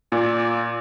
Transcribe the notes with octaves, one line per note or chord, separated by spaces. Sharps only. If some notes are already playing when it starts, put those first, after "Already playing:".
A#2 D5